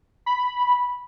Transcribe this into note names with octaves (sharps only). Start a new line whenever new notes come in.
B5